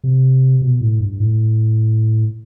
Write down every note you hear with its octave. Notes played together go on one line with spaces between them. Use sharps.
C3
B2
A2
G2
A2